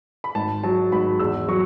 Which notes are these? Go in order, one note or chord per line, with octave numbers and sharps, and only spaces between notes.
B5
G#1 A5
F#3 A5
G#1 B5
E2 E6
F#3 C#6